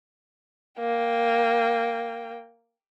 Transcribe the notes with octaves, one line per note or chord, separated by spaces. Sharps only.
A#3 G5